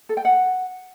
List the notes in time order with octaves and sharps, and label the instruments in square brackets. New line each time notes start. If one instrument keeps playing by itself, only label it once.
[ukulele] A4
G5
F#5